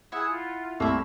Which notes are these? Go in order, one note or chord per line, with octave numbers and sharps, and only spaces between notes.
E4 G#4 F#5 D#6 E6
F4
C2 A3 A#3 C4 E4 C#6 E6